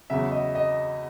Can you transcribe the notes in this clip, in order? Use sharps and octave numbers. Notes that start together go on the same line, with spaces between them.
E2 C#3 F#3 E5
D#5
D#5